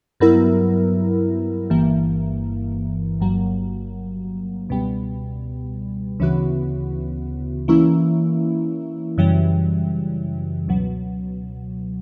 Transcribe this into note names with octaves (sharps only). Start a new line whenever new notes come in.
G2 F#3 B3 E4 A#4
G1 G2 E3 A#3
G1 G2 F#3 A#3
C#2 B2 G3 B3
D2 C#3 E3 B3 F#4
E3 A#3 C#4 E4
F#2 C#3 E3 G3
C#2 B2 F#3